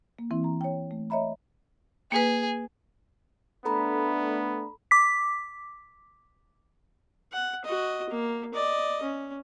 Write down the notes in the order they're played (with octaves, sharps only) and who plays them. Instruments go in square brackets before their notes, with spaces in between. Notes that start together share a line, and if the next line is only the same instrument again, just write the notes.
[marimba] A#3
E3 C4 E4
A#5
C#5 G5
A3
C#5 D#5 E5 A#5 B5
[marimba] A#3 B4 [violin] G#4
[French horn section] A3 D4 [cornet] B3 [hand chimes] A4 A#5 B5
[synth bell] D6 B6
[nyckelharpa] F#5
F#4 D#5
A#3
D5 D#5
C#4